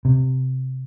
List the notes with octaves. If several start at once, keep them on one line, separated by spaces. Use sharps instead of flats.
C3